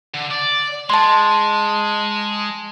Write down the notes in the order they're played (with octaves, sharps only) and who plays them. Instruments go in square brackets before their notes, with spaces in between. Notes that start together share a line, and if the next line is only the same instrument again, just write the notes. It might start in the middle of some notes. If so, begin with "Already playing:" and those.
[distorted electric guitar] D3
D5
[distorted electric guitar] G#3 [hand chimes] A5 C6